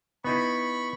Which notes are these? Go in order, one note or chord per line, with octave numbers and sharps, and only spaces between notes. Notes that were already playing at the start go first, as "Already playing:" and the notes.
B3 D#4 E4 B5 C#6